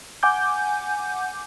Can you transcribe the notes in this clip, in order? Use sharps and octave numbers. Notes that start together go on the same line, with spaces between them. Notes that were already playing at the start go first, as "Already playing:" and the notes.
F#5 G#5 D6 G6